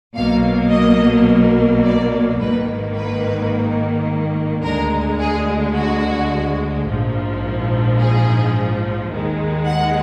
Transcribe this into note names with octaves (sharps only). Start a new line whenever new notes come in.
B1 B2 F#3 A#3 F5
D#5
D5
G#1 G#2 D#3 A#3 B4
B4
D2 D3 G#3 A#4
G#4
F#4
A#1 G#2 F3
G#4
D#2 D#3 G#3
F#5